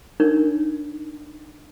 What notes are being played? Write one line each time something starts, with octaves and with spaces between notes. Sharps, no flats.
D4 D#4 A#4 C#5